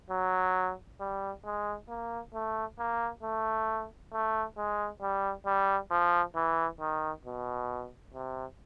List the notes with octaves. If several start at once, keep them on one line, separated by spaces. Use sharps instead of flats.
F#3
G3
G#3
A#3
A3
A#3
A3
A3
G#3
G3
G3
F3
E3
D#3
B2
C3